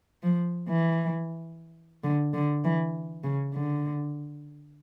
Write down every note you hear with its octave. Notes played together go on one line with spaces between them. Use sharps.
F3
E3
D3
D3
E3
C#3
D3